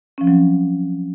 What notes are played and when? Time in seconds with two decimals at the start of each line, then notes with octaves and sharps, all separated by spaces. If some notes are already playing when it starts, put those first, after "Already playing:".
0.18 C#4
0.21 F3
0.24 C4
0.27 F#3